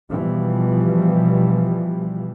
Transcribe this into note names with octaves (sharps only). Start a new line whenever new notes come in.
B2 E3 F3 G3